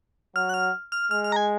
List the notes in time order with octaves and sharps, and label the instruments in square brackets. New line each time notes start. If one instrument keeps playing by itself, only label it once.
[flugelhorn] F#3 [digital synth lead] F6
[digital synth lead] F#6
F6
F6
[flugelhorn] G#3 [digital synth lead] F6
[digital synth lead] F6
A#5
G#5